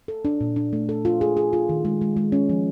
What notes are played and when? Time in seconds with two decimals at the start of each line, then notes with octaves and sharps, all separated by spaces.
0.08 A4
0.25 D4
0.41 A#2
0.56 D4
0.73 A3
0.89 A4
1.05 F4
1.21 G#4
1.37 G#4
1.53 F4
1.69 D#3
1.85 G#3
2.01 G#3
2.17 G#3
2.32 C#4
2.49 F3